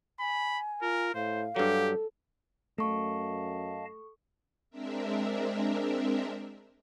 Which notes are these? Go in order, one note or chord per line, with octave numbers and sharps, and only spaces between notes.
G#5 B5
F4 A#4
A2 C5 F5
G2 F#3 G4 A4
F#2 A3 A4 D#5 F5 A5 C#6
G#3 C4 D4 A#4 E5